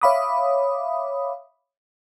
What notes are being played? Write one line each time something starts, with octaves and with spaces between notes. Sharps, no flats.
C#5 E5 F5 B5 D6 D#6